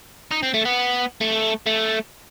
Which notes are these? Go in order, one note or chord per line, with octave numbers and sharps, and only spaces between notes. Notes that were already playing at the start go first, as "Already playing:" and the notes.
D#4
C4
A3
B3
A3
A3